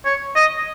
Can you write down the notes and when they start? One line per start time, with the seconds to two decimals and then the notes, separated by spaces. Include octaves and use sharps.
0.05 C#5
0.36 D#5